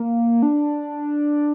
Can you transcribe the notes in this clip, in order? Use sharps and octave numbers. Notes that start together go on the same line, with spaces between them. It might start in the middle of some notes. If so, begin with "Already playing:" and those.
Already playing: A#3
D4